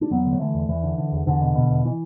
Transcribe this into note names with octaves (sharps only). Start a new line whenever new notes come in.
D4
E2 F#3 B3
D3
F#3
D3 E3 A3
E2
E2 E3
D3
D3
E2
E2 D3
B2
B2
E2
E3